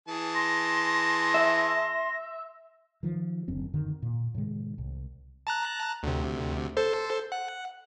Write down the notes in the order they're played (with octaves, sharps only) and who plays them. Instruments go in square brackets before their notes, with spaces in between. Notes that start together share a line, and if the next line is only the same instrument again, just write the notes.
[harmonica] E3 G#4 A5
[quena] C6 [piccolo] A#6
[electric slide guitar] E5
[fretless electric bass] D#3 F3
F#1 F#2 D3 C4
F#2 D3 D#3
A#2
A2 C3 D#3 G#3
C2
[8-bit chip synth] A5 A#5 F#6
D2 C3
A4 C5
F#5